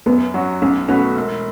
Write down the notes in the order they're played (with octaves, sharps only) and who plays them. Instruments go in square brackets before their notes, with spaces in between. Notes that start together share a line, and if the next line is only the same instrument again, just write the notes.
[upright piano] F#2 [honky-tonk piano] B3
[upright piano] F#3 C#4 F#4
[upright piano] B1 [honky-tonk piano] C#4
[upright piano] B2 A3 F#4 B4 [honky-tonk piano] C#4
[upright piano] E1